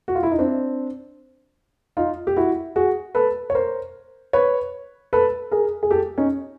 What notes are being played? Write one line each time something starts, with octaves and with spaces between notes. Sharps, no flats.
F#4
F4
E4
D#4
C4 D4
D#4 F4
G4
E4 F#4
F#4 G#4
A4 B4
C#5
A#4 C5
B4 C#5
A4 B4
G#4 A#4
G#4
G4 A4
C#4 D#4